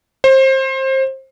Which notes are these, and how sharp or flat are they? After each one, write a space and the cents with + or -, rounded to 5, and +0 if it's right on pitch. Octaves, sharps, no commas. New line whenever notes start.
C5 +25